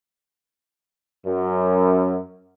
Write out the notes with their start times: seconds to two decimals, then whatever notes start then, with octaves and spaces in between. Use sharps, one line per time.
1.26 F#2